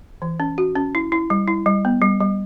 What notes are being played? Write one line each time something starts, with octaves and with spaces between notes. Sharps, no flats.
E3
C#4
F#4
C#4
E4
E4
G3
E4
G3
B3
G3
G3